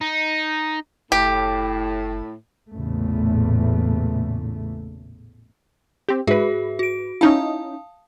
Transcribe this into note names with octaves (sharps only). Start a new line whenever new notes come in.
D#4
F#1 A2 G4
A1 E2 A#2 C#3 A3
C4 G4
G#2 F#4 G#4 B4 E5
F#4 D7
C#4 D#4 E4 F5 A5 D#6